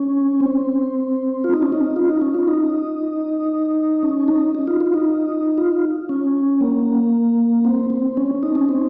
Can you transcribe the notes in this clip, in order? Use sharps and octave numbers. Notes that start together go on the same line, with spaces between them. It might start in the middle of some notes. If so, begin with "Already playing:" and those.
Already playing: C#4
C4
F4
D#4
C#4
D#4
F4
D#4
C#4
F4
D#4
C#4
D#4
D#4
F4
F4
D#4
F4
C#4
A#3
C4
C4
C#4
D#4
C#4
C4